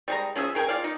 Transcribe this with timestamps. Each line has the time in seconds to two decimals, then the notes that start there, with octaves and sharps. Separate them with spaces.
0.08 G3 G#3 A#5
0.36 F3 C#4 G#4 E5
0.55 G#4 A#4 G5 G#5
0.68 F4 D5 F5
0.84 D#4